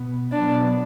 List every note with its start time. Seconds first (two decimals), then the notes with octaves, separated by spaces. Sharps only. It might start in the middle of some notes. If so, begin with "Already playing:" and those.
Already playing: B2 B3
0.32 B2 F#3 B3 D4